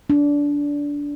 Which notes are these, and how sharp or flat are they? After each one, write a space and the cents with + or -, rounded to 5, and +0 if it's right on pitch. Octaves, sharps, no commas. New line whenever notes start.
D4 -20